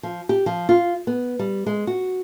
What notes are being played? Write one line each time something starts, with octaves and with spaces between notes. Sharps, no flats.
F3
G4
F3
F4
B3
G3
G#3
F#4